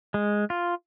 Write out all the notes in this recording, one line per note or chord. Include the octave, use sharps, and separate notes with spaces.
G#3
F4